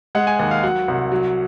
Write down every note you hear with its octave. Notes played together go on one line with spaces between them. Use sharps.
G#3 F#5
G#5
D#2 F#5
F5
F#3 F#5
C2
F#3